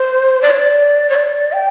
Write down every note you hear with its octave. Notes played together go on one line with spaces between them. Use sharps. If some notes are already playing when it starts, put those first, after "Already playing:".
Already playing: C5
D5
C#5
D5
C#5
D5
G5